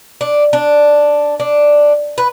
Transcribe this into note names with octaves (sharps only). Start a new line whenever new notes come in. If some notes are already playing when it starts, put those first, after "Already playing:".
D4
D4
D4
B4